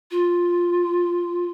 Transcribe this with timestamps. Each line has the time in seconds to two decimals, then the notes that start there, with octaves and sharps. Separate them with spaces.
0.11 F4